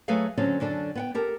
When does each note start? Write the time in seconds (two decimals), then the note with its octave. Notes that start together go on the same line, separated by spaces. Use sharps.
0.08 F#3 A3 G#4 A4 B4 F5
0.38 D3 F#3 C4 C#4 A4
0.60 F#2 D3 D4 A4
0.95 B3 F#5 G5
1.14 G4 A4 A#4